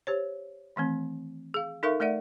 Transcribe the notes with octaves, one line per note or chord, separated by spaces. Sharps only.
G4 C5 C#5
D#3 E3 A3 C4
G#4 F5
D#4 A4 A#4 E5 F5 C#6
A3 A#4 D5 E5 F#5